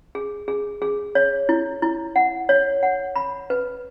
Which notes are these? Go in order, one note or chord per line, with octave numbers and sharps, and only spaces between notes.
G#4
G#4
G#4
C#5
E4
E4
F#5
C#5
F#5
B5
B4